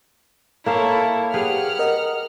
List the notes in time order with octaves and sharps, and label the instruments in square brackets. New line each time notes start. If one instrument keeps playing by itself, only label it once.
[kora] A#3 A4 F5 [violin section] E4 C#5
[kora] G4 G#4 B4 [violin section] F#5 F6
[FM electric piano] A#4 D#5